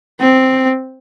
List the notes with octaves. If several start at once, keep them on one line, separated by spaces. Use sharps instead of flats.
C4